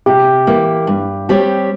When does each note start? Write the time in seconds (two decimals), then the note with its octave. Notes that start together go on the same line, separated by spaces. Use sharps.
0.06 C3 G4
0.47 E3 A#3
0.87 G2
1.29 G3 C4 G4 C#5